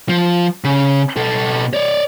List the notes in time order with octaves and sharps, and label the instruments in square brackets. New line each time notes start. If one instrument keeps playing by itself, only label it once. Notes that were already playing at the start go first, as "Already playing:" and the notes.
[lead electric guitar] F3
C#3
B2 A4
C#5 D5